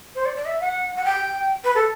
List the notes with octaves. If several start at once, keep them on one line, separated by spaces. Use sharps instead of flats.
C5
D5
D5
E5
F#5
F#5
G5
B4
A4